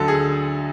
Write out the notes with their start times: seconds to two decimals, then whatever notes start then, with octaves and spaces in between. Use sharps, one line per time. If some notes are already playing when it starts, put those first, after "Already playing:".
Already playing: D2 D3 F#3 A4
0.08 G#4